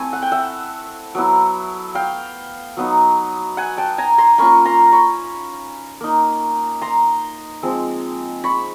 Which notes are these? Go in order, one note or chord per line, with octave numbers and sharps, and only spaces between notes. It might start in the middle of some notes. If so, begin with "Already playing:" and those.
Already playing: A3 C4 E4 G#5
F#5
G5
E5 F#5
F#3 B3 E4
F5 G5
F#3 B3 D#4
F#5 G#5
G5 A5
G#5 A#5
A#5 C6
A#3 C#4 F4 B5 C#6
A#5 C6
B5 C#6
A#3 D#4
A#5 C6
F3 G#3 C4
B5 C#6